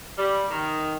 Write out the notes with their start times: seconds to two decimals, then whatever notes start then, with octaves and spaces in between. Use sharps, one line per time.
0.18 G3
0.51 D#3